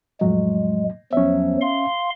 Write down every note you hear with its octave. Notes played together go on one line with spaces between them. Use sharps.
F2 A2 F#3 G#3
E2 F3 F#3 C#4 E5
F5 C6